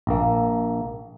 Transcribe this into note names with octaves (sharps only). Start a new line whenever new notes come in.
A#1 A#3